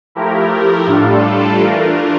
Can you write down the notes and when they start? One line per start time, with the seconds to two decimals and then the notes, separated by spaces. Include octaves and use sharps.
0.15 F3 A3 E4 G4 A#4
0.87 A2 G3 D4 F4 A4
1.58 E3 A3 D4 F4 A#4